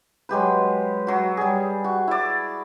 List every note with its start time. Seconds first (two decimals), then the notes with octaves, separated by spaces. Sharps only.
0.29 F#3 G#3 G4 B4
1.07 F#3 F#4
1.37 G3 G#4
1.84 F#4
2.08 E4 D5